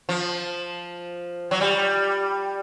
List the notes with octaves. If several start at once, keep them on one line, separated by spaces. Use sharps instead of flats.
F3
F#3
G3